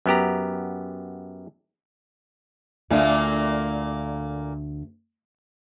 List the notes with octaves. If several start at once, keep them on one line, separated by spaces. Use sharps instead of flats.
F#2 B3 G4 A#5
D2 A#2 D3 A3 A#3 G#5